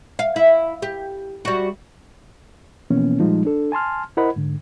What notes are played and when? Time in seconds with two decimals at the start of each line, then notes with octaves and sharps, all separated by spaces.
0.19 F5
0.36 E4
0.82 G4
1.45 G3 F#4
2.90 B2 E3 F3 A#3 B3 C#4
3.20 A#2 F3 G3 G#3 D#4
3.45 D4 A4
3.72 G#5 A5 C6 F6
4.17 E4 A#4 C5 D#5 F#5 B5
4.36 G#2 D3